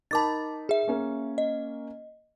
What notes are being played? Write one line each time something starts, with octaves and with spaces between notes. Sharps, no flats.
D#4 A#4 A5 B5 D6 A6
G#4 E5
A#3 C#4 A#4
D#5